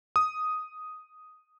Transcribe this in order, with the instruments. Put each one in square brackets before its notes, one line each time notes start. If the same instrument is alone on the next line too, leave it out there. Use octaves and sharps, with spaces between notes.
[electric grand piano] D#6